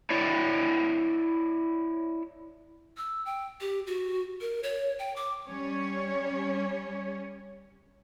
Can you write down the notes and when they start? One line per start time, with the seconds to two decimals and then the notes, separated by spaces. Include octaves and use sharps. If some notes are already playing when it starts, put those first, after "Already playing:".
0.10 E4 C#5 D5
2.97 E6
3.26 G5
3.61 G4
3.87 F#4
4.41 A#4
4.63 C#5
4.99 G5
5.16 D6
5.49 G3 C#4 C#5